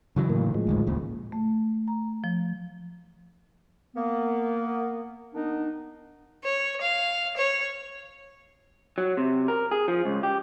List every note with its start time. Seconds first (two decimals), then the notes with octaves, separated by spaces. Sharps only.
0.16 C#3 E3 F#3
0.30 A2 A#3
0.54 A2 F3 G#3
0.67 G#1 D2 G#2
0.87 D#1 C#2 A#2
1.32 A3
1.88 A#5
2.24 F3
3.96 A#3 B3
5.34 D#3 B3 D4 D#4
6.44 C#5
6.81 F5
7.37 C#5
8.98 F#3
9.17 C3
9.48 A#4
9.71 G#4
9.88 F3
10.05 C#2
10.23 G4